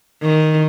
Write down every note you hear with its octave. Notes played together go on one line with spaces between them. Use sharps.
D#3